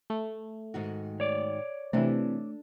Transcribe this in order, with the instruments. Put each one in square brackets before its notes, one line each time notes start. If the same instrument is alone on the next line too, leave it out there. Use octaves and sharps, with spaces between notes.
[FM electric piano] A3
[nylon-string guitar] G#2 D#3 F#4
[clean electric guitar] C#5 D5
[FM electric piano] C3 E3 [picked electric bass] A3 [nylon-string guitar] D4 A4